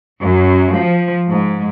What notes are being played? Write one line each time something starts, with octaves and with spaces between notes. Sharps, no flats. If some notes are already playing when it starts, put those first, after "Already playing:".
F#2
F3
G#2